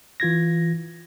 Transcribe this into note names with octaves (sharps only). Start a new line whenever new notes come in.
E3 F4 G#6 A#6